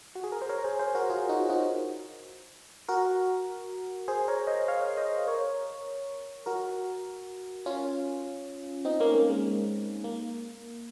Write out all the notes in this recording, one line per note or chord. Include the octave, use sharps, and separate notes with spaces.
F#4
G#4
A#4
C5
A#4 C#5
G#4 C5
G#4 C5
F#4 A#4
F4 G#4
D#4 F#4
D#4 F#4
F#4 A#4
G#4 C5
A#4 C#5
C5 D#5
C#5 F5
C5 D#5
A#4 C#5
F#4 A#4
C#4 F4
C4 D#4
A#3 C#4
A#3
G#3
A#3